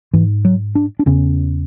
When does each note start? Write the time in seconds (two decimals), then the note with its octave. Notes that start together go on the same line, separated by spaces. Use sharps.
0.14 G#2 E3
0.45 F#3
0.75 D4
0.99 D4
1.06 E2 C#3 C#4